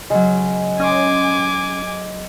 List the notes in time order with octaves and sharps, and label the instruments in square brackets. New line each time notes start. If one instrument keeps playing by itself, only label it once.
[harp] C#3 F#3 [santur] G#3
[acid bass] C#4 [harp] D#5 C6 [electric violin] G#5 D6